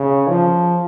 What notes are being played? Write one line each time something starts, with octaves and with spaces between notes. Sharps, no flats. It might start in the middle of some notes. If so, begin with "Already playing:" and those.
Already playing: C#3
F3